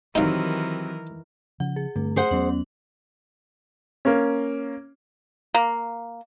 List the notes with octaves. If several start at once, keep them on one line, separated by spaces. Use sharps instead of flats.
D#3 E3 F#3 C4 D#4 G4 A#4 F5
C#3 F3 F#5
G#4
G2 D3 A3 C4
G#4 C5 F#5
E2 F#3 B3 C#4 F#7
A#3 C#4
A#3